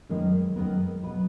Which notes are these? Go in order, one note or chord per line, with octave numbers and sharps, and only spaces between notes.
F#2 D#3 G#3 B3
F#2 D#3 G#3 B3 A#4
B2 F#3 B3 B4